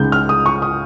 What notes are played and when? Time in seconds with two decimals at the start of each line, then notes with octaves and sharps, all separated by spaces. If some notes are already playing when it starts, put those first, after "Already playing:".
Already playing: C#2 C#3 G#3 D#4 G6
0.12 F6
0.29 D#6
0.46 C#6
0.62 D#6